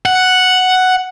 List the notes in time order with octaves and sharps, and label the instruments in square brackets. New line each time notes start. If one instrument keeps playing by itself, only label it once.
[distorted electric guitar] F#5